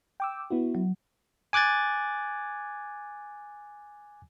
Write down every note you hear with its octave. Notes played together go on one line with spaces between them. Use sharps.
G5 D6 E6
B3 E4 F#4
F#3
G#5 D6 F#6 G#6 A6